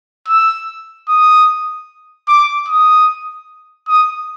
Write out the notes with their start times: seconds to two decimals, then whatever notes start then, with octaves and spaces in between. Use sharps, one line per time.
0.28 E6
1.09 D#6
2.28 D6
2.68 D#6
3.88 D#6